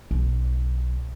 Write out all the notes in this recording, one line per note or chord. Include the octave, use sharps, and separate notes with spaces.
B1